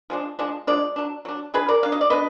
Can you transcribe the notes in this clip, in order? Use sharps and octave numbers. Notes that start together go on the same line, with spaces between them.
F3 G#3 D4
F3 G#3 D4
F3 G#3 D4 D5
F#3 D4
F#3 D4
F#3 D4 G#4 B4
A#4 D5
F#3 D4 F5
D#5
D5
F#3 B3 D4 B4 D#5